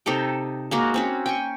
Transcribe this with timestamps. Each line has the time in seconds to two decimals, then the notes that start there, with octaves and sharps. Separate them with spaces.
0.06 C3 D#4 A4 G5
0.71 G#3 A#3 F#4
0.94 C4 C#4 F#4
1.26 G5 G#5 C#6